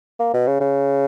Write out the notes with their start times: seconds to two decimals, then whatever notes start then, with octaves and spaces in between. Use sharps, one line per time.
0.19 A#3
0.33 B2
0.47 C#3
0.60 C#3